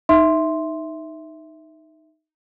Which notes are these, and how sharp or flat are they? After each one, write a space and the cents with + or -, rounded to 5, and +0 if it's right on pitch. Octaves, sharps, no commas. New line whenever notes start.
D#4 +0 E5 -5 C6 +0